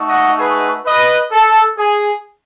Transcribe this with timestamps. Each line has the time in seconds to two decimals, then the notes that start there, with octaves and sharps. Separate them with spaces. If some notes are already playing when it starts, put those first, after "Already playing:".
Already playing: A3 D#4 F#4
0.09 D#5 F#5
0.39 G#4 B4
0.86 B4 D#5
1.32 A4
1.78 G#4